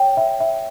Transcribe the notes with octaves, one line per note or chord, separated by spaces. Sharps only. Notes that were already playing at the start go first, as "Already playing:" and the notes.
Already playing: C#5 G5
E5
E5